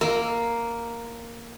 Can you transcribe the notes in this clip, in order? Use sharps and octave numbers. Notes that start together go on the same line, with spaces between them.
A#3